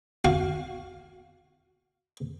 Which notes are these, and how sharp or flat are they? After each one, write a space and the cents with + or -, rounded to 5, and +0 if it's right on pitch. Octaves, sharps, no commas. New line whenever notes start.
F#4 +0 F5 +0